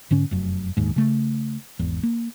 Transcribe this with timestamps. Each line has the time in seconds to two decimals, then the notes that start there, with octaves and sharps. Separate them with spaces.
0.11 G#2 D3 C#4
0.31 F1 F#2
0.77 F#1 D#2 G#2
0.96 C#3 A3
1.79 G#1 E2
2.03 A#3